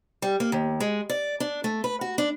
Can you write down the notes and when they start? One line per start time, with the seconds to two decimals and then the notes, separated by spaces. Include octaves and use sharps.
0.22 G3
0.40 A#3
0.52 D#2
0.80 G#3
1.10 D5
1.40 D4
1.64 A3
1.84 B4
2.01 F#4
2.18 D4